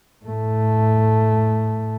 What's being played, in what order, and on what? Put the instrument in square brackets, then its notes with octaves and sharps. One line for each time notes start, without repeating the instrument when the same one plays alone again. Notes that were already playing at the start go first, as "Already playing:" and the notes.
[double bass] A2 A3